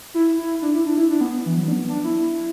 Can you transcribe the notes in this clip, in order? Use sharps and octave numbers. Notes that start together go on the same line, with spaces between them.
E4
E4
D4
E4
D4
E4
D4
B3
E3
F#3
D4
B3
D4
E4